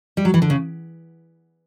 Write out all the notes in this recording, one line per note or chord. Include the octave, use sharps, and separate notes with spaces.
G3
F#3
E3
D3
C#3